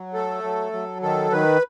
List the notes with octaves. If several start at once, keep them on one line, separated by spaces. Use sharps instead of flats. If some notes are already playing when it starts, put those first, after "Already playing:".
Already playing: F#3
A3 A4
F#3
F#3
D#3 A4
D#3 B4